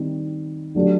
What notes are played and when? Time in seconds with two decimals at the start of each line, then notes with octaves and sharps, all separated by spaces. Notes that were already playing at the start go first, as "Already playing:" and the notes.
Already playing: D#3 G3 C4
0.75 D3 F#3 A3 D4 G4